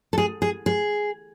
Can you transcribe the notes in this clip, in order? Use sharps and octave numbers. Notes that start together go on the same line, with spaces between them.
A4
G#4
G#4
G#4